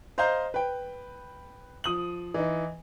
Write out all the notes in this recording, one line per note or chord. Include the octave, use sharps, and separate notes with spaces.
C5 D#5 F5 A#5 G6
B4 G5
F3 D#6 F#7
E3 D#4